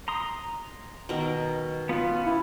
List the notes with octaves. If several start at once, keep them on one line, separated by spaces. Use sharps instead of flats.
A#5 C6 D#6
B2 D#3 A#4
B3 C#4 F4 B4
E4